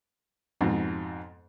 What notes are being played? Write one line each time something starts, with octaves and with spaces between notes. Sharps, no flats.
F2 G#2 B2